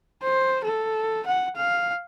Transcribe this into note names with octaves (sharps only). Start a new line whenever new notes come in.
C5
A4
F#5
F5